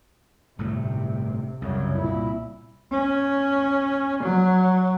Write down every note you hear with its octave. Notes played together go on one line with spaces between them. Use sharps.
G1 A2 C3 A3
C2 F#2 C#3
A#2 E4
C#4
F#3